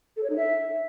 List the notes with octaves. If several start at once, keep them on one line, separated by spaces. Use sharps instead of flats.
A4
C#5
D#4
E5